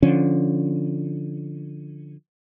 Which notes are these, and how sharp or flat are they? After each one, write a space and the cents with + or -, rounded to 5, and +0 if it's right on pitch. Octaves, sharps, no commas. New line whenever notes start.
D3 +0 F3 +0 C#4 -10